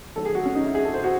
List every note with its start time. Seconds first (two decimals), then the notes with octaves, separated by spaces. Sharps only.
0.16 D#3 F#3 A3 A4
0.25 G#4
0.35 F#4
0.46 C#4
0.55 D#4
0.65 E4
0.75 G#4
0.85 A4
0.94 C5
1.04 F#4